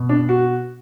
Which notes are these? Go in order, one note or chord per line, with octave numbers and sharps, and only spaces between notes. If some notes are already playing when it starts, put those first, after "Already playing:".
Already playing: B2
D4
F#4